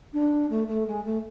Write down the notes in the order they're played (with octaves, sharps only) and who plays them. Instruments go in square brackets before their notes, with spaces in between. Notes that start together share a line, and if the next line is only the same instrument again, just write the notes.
[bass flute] D4
A3
A3
G#3
A3